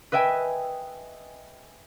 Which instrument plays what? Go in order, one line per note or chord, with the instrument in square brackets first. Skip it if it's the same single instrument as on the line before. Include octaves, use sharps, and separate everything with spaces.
[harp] B4 D#5 E5 G5 G#5